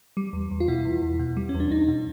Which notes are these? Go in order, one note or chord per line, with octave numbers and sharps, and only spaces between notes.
G3
E2
E2
F4
B2 E4
E2
E2
B2
G3
C#4
E2
D4
E2 D#4
B2